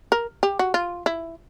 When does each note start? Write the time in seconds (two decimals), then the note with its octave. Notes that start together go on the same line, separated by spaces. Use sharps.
0.12 A#4
0.43 G4
0.59 F#4
0.74 F4
1.06 E4